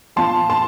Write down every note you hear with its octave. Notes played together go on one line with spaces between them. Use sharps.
A#2 F3 A5 C6
A5 C6